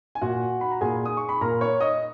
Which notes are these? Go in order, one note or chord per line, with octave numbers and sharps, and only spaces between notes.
G#5
A#2 F#4 F#5
B5
A#5
A#2 G#4 G#5
D#6
C#6
B5
A#2 A#4 A#5
C#5 C#6
D#5 D#6